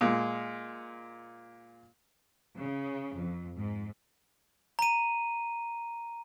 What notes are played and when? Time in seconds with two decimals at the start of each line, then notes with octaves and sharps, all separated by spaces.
0.01 A#2 G#3
2.56 C#3
3.17 F2
3.56 G#2
4.79 A#5 D#7